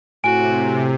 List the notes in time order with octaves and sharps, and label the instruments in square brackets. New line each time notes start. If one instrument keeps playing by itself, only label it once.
[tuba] A2 [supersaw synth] C3 [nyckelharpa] F#4 [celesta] G#5 D7